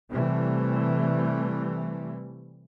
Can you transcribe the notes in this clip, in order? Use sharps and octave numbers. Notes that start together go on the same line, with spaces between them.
C3 E3 G3 A3